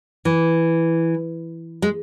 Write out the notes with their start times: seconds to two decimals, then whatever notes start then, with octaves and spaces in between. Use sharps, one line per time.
0.25 E3
1.82 G#3